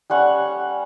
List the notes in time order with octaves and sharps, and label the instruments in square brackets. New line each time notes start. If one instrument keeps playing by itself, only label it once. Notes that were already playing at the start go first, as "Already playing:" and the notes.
[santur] G3 C#4 F#5 C#6